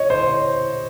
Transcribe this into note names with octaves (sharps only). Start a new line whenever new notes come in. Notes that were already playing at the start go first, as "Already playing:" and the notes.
Already playing: C#5 D#5
C5